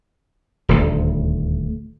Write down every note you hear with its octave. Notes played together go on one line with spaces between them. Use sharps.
D#1 D2